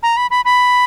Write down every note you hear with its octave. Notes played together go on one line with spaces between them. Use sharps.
A#5
B5
B5
B5